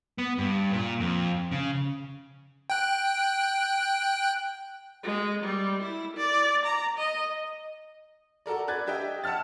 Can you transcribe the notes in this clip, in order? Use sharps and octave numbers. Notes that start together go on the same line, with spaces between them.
B3
G2
A#2
F2
C#3
G5 F#6
G#3
G3
E4
D5
A#5
D#5
F#4 A4 A#4 D5
B4 D5 F#6 G#6 A6
D4 G4 D#5 E5 G5
F#5 A5 E6 F6 A6